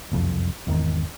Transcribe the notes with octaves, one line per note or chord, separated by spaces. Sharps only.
F#1 C2 F2
G#1 E2 B2 D#3